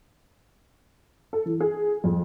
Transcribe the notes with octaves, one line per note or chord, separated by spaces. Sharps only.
A4
E3
G#4
F2